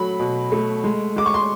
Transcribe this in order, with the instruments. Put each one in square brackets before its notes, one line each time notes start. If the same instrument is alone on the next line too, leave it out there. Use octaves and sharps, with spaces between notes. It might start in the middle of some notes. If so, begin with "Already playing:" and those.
Already playing: [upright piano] F#3 A3 B5
B2
A3
G#3
G#3 D6
C#6
C6